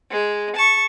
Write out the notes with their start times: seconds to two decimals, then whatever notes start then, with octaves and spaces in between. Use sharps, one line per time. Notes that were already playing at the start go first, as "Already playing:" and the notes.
0.11 G#3
0.55 A5 C#6